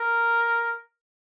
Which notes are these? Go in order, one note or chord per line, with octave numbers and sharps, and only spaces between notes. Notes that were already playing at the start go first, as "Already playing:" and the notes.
Already playing: A#4